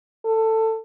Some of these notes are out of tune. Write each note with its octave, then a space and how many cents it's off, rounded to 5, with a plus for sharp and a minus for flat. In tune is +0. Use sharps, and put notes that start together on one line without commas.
A4 +15